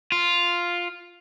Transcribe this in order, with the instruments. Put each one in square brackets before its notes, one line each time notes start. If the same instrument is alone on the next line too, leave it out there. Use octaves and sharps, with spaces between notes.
[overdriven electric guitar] F4